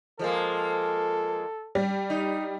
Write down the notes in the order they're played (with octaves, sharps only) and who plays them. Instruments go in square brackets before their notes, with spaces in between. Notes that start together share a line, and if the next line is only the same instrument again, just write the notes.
[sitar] F3 G#3 A#3 [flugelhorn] A4
[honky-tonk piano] G3
[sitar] D#4